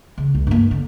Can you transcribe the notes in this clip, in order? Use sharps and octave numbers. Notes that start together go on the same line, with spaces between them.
C#3
C#2
G2 A#3
D3